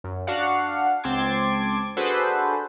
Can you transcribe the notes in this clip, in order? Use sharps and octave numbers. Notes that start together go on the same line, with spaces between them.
F#2
D4 F#4 D5 F5 F#5
C#2 C4 A5 C6 D6 G#6
D4 F#4 G#4 A4 B4 C5